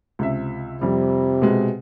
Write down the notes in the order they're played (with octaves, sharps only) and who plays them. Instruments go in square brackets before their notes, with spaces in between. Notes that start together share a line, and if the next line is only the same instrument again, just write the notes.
[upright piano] C#2 C3 E5
[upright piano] F2 G3 [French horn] C3
[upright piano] B2 G#3